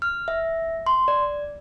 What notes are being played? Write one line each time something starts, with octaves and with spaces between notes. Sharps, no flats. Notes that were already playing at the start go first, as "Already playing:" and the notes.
F6
E5
C6
D5